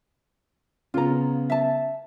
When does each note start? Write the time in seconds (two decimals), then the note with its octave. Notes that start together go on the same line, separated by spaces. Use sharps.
0.94 C#3 B3 F4 A#5
1.50 E5 A5